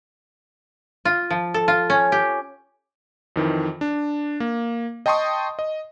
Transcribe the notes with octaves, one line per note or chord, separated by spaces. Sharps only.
F4
F3
A4
F4
C#4
G4
F2 D#3 E3
D4
A#3
D#5 G5 A5 C6 C#6 D#6
D#5